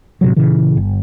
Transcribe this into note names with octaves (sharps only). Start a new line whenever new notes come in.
A2 C3 F#3
A#2 C#3 E3
G1